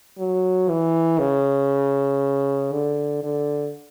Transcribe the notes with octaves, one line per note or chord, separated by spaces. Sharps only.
F#3
E3
C#3
D3
D3